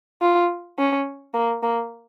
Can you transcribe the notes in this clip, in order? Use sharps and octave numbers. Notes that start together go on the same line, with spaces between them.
F4
C#4
A#3
A#3